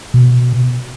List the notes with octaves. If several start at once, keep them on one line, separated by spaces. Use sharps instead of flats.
B2